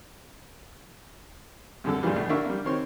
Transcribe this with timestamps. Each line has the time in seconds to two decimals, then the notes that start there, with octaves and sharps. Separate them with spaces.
1.84 C2 F#2 D3 A4
2.03 G2 A#2 C#3 E3 G3
2.16 A#1 A3
2.29 D3 A#3 D4 E4 E5 C#6
2.46 G3 A#3
2.64 D#3 C4 C#5 C6